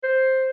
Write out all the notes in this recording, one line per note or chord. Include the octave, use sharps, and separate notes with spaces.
C5